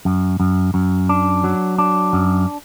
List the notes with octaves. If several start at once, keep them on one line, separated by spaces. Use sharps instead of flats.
F#2
F#2
F#2
D4
F#3
D4
F#2